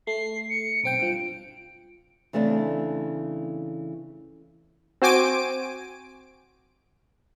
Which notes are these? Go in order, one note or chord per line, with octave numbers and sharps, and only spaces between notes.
A3 C7
C#7
B1 C4 G5 D7
G2 F3
C#3 E3 A3 C4 D4
C4 F#4 C5 G#5 D6 D7